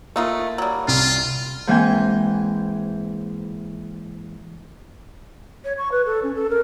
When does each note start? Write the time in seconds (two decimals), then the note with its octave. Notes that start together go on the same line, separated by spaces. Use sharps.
0.16 A3 A#3 D#4 F4
0.58 F#3 G3
0.88 C2 F4
1.67 G#2 E3 A#3 C4 G5 G#5
5.64 C#5
5.77 C#6
5.91 B4
6.05 A4
6.23 C#4
6.34 A4
6.50 A#4